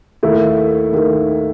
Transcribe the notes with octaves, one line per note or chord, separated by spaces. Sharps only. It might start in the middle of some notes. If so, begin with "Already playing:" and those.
D#2 D#3 A3 E4
D#2 D#3 A3